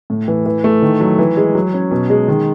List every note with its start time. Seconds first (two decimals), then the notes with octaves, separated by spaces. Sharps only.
0.10 A2
0.28 E3
0.46 E3
0.64 A3
0.82 D#3
1.01 F#3
1.19 E3
1.37 G#3
1.55 F#3
1.74 C#4
1.91 B2
2.10 G#3
2.28 D#3